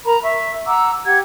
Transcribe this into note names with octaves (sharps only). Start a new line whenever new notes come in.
A#4 A#5 B5
E5 C#6
F#5 A#5 D6 E6
G4 F#5 G#6